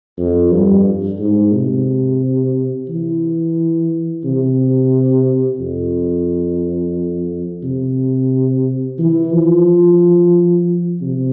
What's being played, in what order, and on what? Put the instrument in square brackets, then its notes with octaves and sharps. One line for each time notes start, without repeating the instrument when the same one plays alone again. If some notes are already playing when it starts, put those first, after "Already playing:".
[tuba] F2
G2
G#2
C3
E3
C3
F2
C3
E3
F3
C3